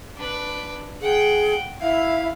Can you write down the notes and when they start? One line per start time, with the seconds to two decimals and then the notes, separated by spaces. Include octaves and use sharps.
0.16 D4 B4
1.01 G#4 F#5 G5
1.81 E4 E5 F5